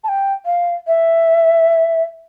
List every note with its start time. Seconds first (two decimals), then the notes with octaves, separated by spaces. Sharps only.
0.04 A5
0.08 G5
0.46 F5
0.87 E5